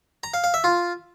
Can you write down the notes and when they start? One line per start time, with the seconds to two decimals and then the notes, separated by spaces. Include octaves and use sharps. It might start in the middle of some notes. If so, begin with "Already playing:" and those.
0.23 A#5
0.34 F5
0.44 F5
0.54 E5
0.64 F4